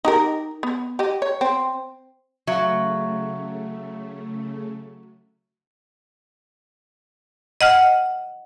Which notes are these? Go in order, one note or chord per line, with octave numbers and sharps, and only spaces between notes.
D#4 G4 A#4
B3
G4 D#5
C#5
C4
C#3 F#3 A3 E5 F5
D#5 F#5 F6